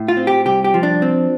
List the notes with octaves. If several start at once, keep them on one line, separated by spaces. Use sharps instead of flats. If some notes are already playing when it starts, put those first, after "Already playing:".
Already playing: A2
F4
C4
G4
C2 G4
G4
F3
D4
C4